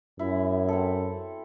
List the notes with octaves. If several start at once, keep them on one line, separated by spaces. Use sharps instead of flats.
F#2 E4
C4 A4